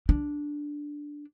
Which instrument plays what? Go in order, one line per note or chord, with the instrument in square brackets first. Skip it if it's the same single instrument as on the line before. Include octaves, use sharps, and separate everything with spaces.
[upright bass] D4